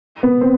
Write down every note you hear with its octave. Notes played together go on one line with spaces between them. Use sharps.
B3
C4